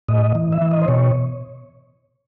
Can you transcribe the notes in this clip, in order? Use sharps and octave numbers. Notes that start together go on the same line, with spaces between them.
A2 D#5
E3
E5
E3
D#5
C5
B2 C#5